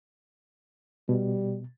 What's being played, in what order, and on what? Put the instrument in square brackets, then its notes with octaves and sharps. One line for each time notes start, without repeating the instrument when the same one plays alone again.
[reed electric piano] B2 [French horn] G3